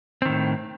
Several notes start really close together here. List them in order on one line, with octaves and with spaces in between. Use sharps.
C4 D#3 A2